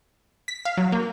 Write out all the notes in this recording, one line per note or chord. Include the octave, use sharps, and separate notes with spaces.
B6
F5
F#3
A#3